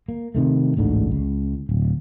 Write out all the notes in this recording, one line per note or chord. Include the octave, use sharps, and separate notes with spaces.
A#3
C3 D#3 A3
A1 D2 G#2 D3
C#2
D1